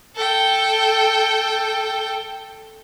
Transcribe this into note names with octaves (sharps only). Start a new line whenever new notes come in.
A4 G5